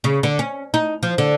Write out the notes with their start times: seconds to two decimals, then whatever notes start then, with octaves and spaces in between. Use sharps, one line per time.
0.04 C#3
0.23 D3
0.39 C#4
0.74 D#4
1.03 F3
1.18 D3